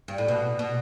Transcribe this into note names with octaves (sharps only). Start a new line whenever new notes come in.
G2
A2
B2
B2